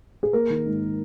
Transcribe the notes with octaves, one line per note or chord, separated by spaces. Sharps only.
G#4
A#3 A#4
D#3
G#2